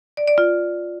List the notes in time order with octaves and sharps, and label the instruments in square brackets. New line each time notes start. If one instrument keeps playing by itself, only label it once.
[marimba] D5
D5
F4